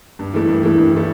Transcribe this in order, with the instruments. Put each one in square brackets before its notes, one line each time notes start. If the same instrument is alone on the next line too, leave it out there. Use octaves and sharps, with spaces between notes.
[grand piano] G2
E3 A3
G2
E3 A3
G2
E3 A3